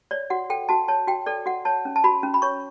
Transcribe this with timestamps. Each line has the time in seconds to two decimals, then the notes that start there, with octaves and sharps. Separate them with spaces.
0.11 C#5 D5
0.30 F#4 F#5
0.50 A4 G5
0.69 F#4 A5
0.88 C#5 A5
1.07 F#4 G5
1.26 A4 D5
1.46 F#4 F#5
1.65 C#5 A5
1.85 C#4
1.96 A5
2.04 F#4 B5
2.23 C#4
2.34 B5
2.42 C#5 C#6